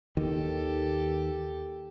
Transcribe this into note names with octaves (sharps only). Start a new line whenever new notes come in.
D#2 D#3 G4 A4